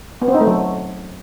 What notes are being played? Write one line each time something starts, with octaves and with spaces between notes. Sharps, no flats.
B3
C4
D#4
A3
F#3